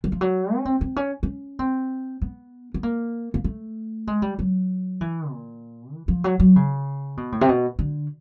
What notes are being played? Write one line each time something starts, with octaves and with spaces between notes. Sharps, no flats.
F#3
F3
F#3
C#4
C4
C4
C#4
C#4
C4
B3
B3
A#3
A#3
A3
G#3
G3
F#3
E3
A#2
E3
F3
F#3
F#3
C#3
B2
A2
C3
B2
D3